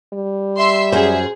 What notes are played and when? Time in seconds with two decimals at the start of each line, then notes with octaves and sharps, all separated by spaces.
0.14 G3
0.58 E5 C6 E6
0.92 F#2 G#4 C5